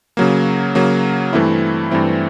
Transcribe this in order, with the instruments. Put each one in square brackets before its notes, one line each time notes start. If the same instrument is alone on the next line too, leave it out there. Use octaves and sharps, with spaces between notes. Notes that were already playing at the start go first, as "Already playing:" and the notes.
[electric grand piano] C#3 F#3 A#3
C#3 F#3 A#3
G2 E3 A3 C4 E4
G2 E3 A3 C4 E4